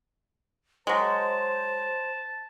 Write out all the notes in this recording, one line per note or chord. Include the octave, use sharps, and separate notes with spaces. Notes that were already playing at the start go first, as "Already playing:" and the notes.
F#3 G#3 C5 A5